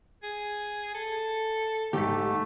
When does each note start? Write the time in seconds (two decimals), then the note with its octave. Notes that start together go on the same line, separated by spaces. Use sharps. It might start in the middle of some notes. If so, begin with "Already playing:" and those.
0.23 G#4
0.95 A4
1.93 D#2 G#2 A3 G4